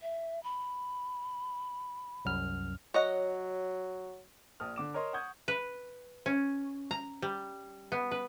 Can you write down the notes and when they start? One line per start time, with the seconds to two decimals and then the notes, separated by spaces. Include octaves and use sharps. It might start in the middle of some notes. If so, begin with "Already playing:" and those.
0.02 E5
0.43 B5
2.25 C2 F#2 F6
2.94 F#3 C#5 D#5 F#5
4.60 A#1 D#6 F6
4.76 D3 D6 E7
4.94 A#4 C#5 D#5 C6
5.13 F#5 C#6 D#6 G6 G#6
5.48 B4
6.26 C#4
6.91 A#5
7.22 G3
7.92 B3
8.11 B4